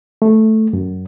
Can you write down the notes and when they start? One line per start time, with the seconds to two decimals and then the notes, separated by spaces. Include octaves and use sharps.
0.22 A3
0.73 F#2